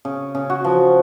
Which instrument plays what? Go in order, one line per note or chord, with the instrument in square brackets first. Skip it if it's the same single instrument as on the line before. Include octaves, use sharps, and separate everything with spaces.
[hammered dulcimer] C#3
C#3
F#4
F3